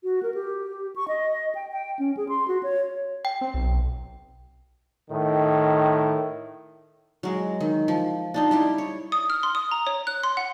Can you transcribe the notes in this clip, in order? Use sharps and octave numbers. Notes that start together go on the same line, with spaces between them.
F#4
A#4
G4
C#6
D#5
G5
G5
C#4
G#4
C6
F#4
C#5
G5
C4
B1
A2 D#3
F#3 G#3
D#3
F3
D4 D#4 F4
G3 E4 G4
C#5
D#6
F6
C6
D#6
A#5
C#5
F#6
C6
F#5